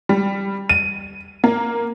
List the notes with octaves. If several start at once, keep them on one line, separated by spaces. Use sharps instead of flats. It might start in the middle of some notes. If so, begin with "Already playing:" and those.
G3
D#7
A#3